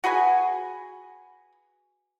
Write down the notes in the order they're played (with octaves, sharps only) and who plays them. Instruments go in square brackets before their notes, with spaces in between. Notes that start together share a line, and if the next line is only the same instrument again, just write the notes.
[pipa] F#4 G#4 B4 G#5